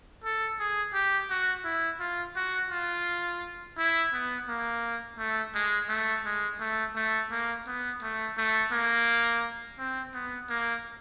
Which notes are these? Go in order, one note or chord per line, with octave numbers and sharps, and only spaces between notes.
A4
G#4
G4
F#4
E4
F4
F#4
F4
E4
B3
A#3
A3
G#3
A3
G#3
A3
A3
A#3
B3
A3
A3
A#3
C4
B3
A#3